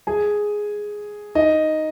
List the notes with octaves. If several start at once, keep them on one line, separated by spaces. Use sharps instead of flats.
G#4 G#5
D#4 D#5